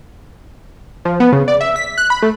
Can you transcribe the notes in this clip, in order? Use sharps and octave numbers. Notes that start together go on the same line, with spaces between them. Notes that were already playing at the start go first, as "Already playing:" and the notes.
F3
B3
C#3
D5
E5
B6
F#6
B5
A3